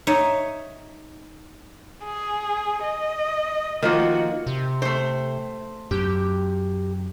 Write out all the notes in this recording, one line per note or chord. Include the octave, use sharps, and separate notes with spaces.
D#4 C#5 E5
G#4
D#5
D#3 F3 A#3 F#4
C3
A3 C5
F#2 G4